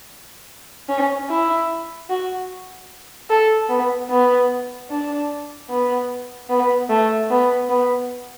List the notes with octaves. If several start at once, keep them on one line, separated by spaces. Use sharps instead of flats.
C#4
E4
F#4
A4
B3
B3
D4
B3
B3
A3
B3
B3